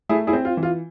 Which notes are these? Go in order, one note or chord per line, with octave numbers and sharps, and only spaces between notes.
A3 E4 G#4
E4 G#4
C4
F4
E3
F4